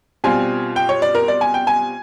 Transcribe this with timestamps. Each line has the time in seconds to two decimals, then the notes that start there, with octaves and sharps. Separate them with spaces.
0.24 B2 G3 C4 F4 G#5
0.76 G5
0.89 C#5
1.02 D5
1.15 A#4
1.28 D5
1.41 G#5
1.54 G5
1.67 G#5